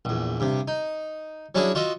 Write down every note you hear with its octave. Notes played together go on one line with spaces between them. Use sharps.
A#1 E2
G2 C3
D#4
F#3 C#4 D4 E4 F#4 G#4
F4 F#4 D#5 E5